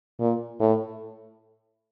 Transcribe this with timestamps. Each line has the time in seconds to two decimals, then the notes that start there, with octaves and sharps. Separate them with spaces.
0.20 A#2
0.60 A2